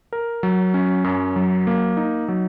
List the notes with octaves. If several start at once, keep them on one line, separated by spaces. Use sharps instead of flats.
A#4
F#3
C#4
F#2
F#3
A#3
D#4
F#3